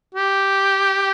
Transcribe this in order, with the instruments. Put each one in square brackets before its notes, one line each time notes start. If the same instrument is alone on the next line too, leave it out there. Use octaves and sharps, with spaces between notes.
[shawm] G4